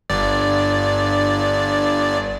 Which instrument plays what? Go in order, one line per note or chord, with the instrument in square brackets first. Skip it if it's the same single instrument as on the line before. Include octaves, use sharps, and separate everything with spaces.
[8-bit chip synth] G1 G2 D5